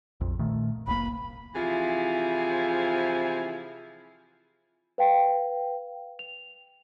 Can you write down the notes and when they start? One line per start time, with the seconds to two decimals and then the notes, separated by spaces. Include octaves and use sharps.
0.21 A#1 F2
0.39 A#2 D#3 A3
0.87 F1 C2 A#3 B5
1.55 C3 E3 F3 E4 F4 G#4
4.98 B4 F5 G5
6.19 F7